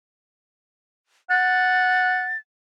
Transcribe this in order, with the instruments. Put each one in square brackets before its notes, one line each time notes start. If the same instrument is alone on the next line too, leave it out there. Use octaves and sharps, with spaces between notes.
[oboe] F#5 [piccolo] A6